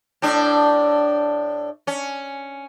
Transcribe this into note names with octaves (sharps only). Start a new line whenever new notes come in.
A2 D4
C#4